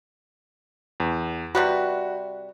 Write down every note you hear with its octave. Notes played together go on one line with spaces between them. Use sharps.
E2
C3 G3 F#4 B4